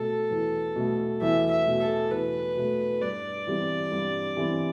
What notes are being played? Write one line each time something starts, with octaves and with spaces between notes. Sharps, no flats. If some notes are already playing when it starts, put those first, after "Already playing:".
Already playing: B2 A3 A4
E2
B2 A3
E2 E5
E5
B2 A3
A4
E2 B4
B2 A3
G2 D5
E3 G3 C4
G2
E3 G3 C4